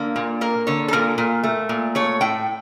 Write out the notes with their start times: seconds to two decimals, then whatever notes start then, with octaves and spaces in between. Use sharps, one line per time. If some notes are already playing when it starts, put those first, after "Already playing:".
Already playing: D3 A#3
0.16 A#2
0.41 A#3 A#4
0.67 D3 C#5
0.88 A4
0.93 A#2 A#4
1.18 A#2
1.43 A3
1.69 A#2
1.95 A3 C#5
2.21 A2 G5